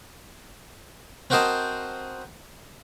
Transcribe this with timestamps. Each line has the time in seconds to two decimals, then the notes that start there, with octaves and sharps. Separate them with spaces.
1.30 C4 F#4 A#4 C5 D#5 A5